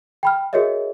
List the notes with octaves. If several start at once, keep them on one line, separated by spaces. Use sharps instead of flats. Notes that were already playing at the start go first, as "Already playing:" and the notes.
G5 B5 F6
F#4 G#4 A#4 C#5 D#5 E5